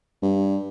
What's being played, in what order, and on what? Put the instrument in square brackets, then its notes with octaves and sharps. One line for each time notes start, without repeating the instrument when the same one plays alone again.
[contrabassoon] G2